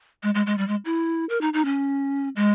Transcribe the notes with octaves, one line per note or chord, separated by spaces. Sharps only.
G#3
G#3
G#3
G3
G#3
E4
A#4
D#4
D#4
C#4
G#3